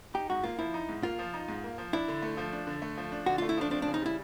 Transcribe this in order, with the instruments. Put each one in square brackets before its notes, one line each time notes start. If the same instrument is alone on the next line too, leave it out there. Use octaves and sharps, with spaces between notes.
[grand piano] D#4 [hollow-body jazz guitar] G4
[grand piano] G#2 [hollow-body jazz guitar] F#4
[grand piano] A#3 [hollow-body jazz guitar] F4
[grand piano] F3 [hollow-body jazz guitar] E4
[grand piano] D#4
G#2
[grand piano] A#3 [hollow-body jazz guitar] F4
[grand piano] F3
D#4
G#2
A#3
F3
[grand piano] D4 [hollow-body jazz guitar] E4
[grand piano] D3
A3
F3
D4
D3
A3
F3
D4
[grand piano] D3 [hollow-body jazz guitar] F#4
[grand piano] A3 [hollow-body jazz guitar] F4
[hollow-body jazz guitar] E4
[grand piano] F3 [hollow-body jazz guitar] D4
[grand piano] C4 [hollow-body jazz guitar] D4
[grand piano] C#3 [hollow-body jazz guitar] D4
[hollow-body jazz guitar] D#4
[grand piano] G3 [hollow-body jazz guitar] E4